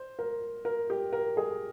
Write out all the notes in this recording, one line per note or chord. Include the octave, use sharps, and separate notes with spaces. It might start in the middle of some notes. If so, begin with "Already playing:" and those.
Already playing: C5
A#4
A#4
G4
A#4
G#4